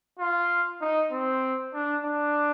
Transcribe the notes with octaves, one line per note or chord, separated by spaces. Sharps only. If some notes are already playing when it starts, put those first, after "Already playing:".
F4
D#4
C4
D4
D4